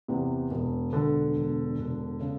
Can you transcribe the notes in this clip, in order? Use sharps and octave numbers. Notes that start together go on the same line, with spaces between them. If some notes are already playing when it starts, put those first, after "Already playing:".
E2 C3
E1
E1 D3
E1
E1
C#3